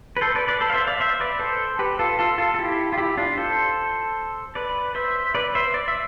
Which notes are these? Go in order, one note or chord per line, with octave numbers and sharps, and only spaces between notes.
B4
A4 C5
B4 D5
B4 D5
A4 C5
F5
C5 E5
D5 F5
C5 E5
B4 D5
A4 C5
G4 B4
F4 A4
F4 A4
F4 A4
A4
E4 G4
F4
E4 G4
D4 F4
A4 C5
B4 D5
C5 E5
B4 D5
C5 E5
D5
E5